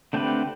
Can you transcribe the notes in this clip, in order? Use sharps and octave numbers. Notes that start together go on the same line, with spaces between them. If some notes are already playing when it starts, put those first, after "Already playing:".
D3 A3 C4 G4 B4